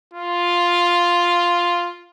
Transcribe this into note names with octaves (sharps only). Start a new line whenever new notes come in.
F4